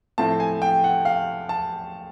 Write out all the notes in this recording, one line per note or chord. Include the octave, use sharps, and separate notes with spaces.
A2 F3 A3 C4 E4 A5
G#5
G5
F#5
F5
A5